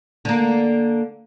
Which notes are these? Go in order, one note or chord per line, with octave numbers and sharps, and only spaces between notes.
D3 A#3